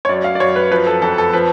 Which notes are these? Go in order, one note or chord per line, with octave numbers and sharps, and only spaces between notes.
C#5
F#2 D5
F5
D5
F#2 C#5
B4
F3 B4
A4
F2 A4
A4
F3 B4